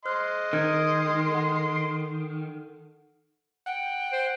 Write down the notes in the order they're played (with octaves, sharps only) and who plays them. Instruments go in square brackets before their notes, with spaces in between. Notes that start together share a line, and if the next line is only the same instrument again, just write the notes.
[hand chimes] C5 F6 F#6 [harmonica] D#5 C6
[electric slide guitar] D#3 [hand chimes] D#6 F6 G#6
[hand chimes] A4 F#5
[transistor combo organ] F#5 [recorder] G5
[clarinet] C5